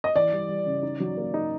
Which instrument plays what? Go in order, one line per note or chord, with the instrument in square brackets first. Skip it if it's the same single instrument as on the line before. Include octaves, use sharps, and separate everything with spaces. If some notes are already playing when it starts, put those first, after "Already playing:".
[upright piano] D#5
[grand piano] E3 [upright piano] D5
[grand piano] G3
G3
C#3
D#4
F#3
A#3
D#4